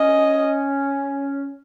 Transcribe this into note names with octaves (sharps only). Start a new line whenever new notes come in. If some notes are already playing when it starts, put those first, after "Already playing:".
Already playing: C#4 D#5